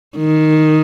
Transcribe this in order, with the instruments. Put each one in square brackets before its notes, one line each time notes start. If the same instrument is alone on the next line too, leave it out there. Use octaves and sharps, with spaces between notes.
[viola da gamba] D#3